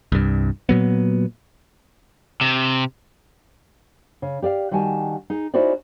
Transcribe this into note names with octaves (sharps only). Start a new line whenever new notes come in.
C2 G2
A#2 F#3 B3
C3
C#3
G4 D5 E5 F5
D#3 G3 F#4 F#5 G#5 A5
D#4 G#4
C#4 D#4 E4 F#4 C5 D5